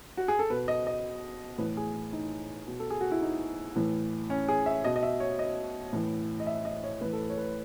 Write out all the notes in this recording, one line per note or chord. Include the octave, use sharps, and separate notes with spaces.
F#4
G#4
A4
B2 B4
D#5
D#5
A2 E3 B4
G#4
D#4
B2
A4
G#4
F#4
E4
D#4
A2 E3
C#4
G#4
E5
B2 D#5
D#5
E5
C#5
D#5
A2 E3
D#5
E5
D#5
C#5
A2 E3 B4
A4
B4
C#5
B4